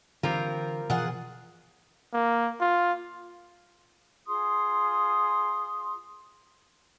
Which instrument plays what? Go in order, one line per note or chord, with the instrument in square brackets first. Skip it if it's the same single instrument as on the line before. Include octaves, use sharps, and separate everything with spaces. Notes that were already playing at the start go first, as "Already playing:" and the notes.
[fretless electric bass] D3 E3 [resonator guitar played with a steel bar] G3 C4 F4 [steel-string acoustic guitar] A#4
[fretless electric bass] B2 E3 F3 [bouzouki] F4 G#4 F#5
[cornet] A#3
F4
[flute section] F4 G#4 C6 D#6